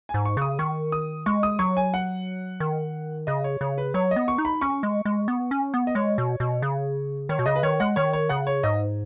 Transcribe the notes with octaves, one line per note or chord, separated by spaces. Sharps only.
G#5
G#2
C#6
C#3 C#6 D#6
D#3 C#6
D#6
G#3 C#6
D#6
F#3 C#6
G#5
F#5
D#3
C#3 D#5
C#5
C#3 C#5
B4
F#3 C#5
D#5
B3
C#6
D#4
B5
C#4 C#6
G#3
G#3
B3
C#4
B3
D#5
G#3 C#5
B2
B2
C#3
D#3 C#5
B2
C#3 D#5
B4
D#3 C#5
G#3 F#5
D#3 C#5
C#5
C#3 F#5
C#5
G#2 D#5